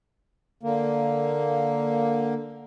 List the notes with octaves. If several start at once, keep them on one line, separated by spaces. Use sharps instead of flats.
D3 A#3